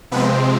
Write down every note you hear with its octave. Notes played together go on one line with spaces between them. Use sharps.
C3 F3 G#3 B3 C4 B4